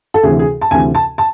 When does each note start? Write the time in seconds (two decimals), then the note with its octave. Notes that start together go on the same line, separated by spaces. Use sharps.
0.14 A4
0.23 D2 C3 E3 G#4
0.39 G#4
0.61 A5
0.71 D2 C3 E3 G#5
0.95 A5
1.18 A5